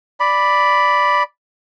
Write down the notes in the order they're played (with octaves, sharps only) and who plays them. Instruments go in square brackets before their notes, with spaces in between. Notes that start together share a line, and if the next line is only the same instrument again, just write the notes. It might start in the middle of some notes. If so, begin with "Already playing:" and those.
[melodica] D5 B5